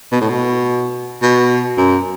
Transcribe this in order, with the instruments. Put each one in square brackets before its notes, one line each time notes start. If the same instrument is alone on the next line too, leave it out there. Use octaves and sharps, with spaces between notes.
[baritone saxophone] B2
A2
B2
B2
F#2